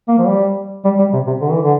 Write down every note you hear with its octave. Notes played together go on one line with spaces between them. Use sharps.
A#3
F3
G3
G3
G3
C3
C3
D3
E3
D3